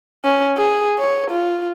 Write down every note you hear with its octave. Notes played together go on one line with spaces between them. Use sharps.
C#4
G#4
C#5
F4